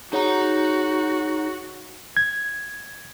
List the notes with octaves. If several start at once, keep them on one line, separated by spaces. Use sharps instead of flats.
D#4 F#4 G#4 C#5 F#5 A#5
G#6